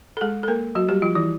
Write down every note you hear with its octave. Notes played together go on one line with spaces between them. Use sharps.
A4
G#3 G#4
A4
A#3 A#4
F#3 F#4
G3 G4
F3 F4
E3 E4